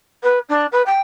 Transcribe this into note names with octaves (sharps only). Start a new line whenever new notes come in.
B4
D4
B4
G5